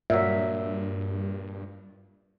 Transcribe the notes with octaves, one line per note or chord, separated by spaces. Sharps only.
G2 A#2 F#3 E5